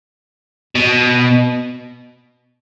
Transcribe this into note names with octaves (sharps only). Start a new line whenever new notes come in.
B2